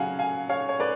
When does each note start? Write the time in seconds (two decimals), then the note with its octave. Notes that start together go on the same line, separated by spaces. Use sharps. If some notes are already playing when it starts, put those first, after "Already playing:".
Already playing: C#3 F#3 F5 F#5 G#5
0.19 F5 G#5
0.49 C#5 F5
0.69 C#5
0.80 B4 D5